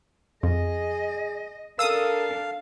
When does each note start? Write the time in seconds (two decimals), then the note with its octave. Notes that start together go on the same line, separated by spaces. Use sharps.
0.43 F2 G#4 D#5
1.79 D4 A4 A#4 F5 D#6 E6